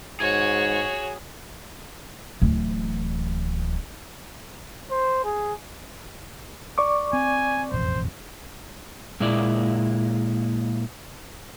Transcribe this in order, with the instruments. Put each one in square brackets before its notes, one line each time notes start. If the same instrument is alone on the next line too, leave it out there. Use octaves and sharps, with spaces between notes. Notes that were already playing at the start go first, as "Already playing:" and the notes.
[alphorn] G#2 [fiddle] F#4 C#5 [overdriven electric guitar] G#4
[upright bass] D1 E3
[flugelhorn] C5
G#4
[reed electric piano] D5 C#6 D6
[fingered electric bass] C4 [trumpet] G#5
[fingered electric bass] E1 A1 F2 [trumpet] C5
[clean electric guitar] A#2 G#3 A#3 E4 D5